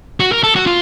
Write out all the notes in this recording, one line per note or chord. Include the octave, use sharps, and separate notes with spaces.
F#4
A#4
A4
F#4
F4